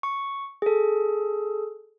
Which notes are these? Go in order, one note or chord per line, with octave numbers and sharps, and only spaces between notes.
C#6
G#4 A4